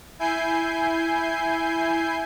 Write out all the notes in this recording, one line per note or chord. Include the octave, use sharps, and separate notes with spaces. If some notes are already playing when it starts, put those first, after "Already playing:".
E4 G#5 G6 C7